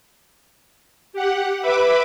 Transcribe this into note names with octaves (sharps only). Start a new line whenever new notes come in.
G4 F#5
B4 E5 B5 D6